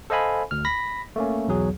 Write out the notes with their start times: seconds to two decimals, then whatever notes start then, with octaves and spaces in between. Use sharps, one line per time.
0.10 A4 C5 D#5 F5 G#5 B5
0.51 D2 F6
0.65 B5 A#6 B6
1.16 A3 A#3 C#4
1.48 B1 E2 F#3 G#4